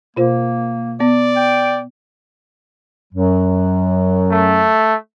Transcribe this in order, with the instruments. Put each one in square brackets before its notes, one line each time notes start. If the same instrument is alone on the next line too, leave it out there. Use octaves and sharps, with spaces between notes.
[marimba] B2 F4 C5 [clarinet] A#3
[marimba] B3 [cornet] D5
[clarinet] G5
[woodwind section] F#2 F#3
[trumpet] A3